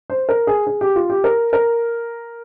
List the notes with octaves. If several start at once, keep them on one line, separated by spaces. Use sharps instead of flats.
C5
A#4
G#4
G#4
G4
F4
G4
A#4
A#4